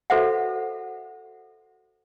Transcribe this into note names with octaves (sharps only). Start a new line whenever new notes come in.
F#4 A4 B4 C5 E5 F#5